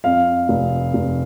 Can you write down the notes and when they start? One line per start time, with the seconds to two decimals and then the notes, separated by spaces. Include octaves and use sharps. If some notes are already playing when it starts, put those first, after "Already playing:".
0.04 F2 F5
0.49 F1
0.94 F1